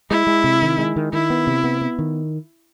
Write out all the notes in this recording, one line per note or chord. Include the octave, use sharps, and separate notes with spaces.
G#3 E4
G#3
C3
D#3
G#3
D#3
D#3 E4
B3
C3
B3
B3
D#3